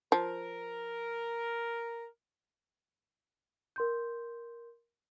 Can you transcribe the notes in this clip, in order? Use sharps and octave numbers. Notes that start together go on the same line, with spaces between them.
F3 A#4
A#4 C6 G6